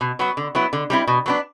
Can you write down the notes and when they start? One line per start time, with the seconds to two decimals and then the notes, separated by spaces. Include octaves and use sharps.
0.01 B2
0.19 F#3 B3 F#4
0.37 D3
0.55 F#3 B3 E4
0.73 D3
0.90 G3 C4 E4
1.07 B2
1.26 F#3 B3 D4